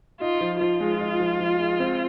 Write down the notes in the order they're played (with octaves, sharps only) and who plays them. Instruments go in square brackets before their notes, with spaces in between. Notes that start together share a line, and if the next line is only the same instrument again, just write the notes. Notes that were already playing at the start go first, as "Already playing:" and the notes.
[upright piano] D#4 [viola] F4
[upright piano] F3
[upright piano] F3 [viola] F4
[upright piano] G#3
D#4
F3
F3
G#3
C4